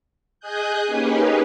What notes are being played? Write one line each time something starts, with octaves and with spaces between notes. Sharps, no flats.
G#4 D#5 G#5 D#6 F#6 G6
A#3 C#4 D#4 G4 G#4 B4